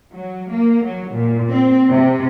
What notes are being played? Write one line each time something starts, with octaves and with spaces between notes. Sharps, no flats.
F#3
A#3
F#3
A#2
C4
C3